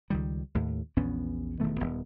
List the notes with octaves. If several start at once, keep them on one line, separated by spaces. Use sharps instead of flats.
C#2 D#3 G3
D#2 A2
A#1 E2 B3 C#4
E1 D#3 A3 B3
D#1 G#1 B3